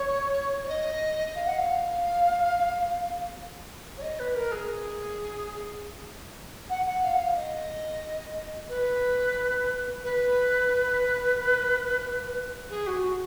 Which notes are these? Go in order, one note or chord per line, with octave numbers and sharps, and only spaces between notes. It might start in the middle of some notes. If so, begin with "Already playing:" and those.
Already playing: C#5
C#5
D#5
F5
F#5
F5
C#5
D#5
B4
A#4
G#4
F#5
F#5
F5
F#5
F5
D#5
B4
B4
G#4
F#4
F#4